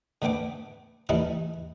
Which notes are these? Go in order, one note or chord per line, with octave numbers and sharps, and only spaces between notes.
D3 A3 B3 G5 D6
E3 G3 A3 D#4 E4